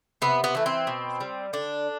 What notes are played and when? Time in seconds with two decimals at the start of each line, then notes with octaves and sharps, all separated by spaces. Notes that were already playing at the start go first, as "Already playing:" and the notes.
0.22 C3 B3
0.44 B3
0.55 E3 A3
0.66 C4
0.87 B2
1.21 G3
1.53 D3 D4